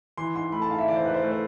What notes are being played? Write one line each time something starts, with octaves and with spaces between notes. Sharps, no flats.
E3 C6
G#2 C6
A3 B5
A5
G#2 F5
E5
E3 D5
C5
G#2 B4
C5
A3 B4
C5